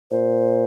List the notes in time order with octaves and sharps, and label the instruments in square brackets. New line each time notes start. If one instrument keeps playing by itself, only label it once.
[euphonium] A#2 [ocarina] C5